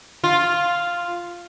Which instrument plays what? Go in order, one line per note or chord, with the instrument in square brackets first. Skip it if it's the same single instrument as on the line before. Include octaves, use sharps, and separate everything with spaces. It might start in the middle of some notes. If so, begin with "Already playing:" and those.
[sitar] F4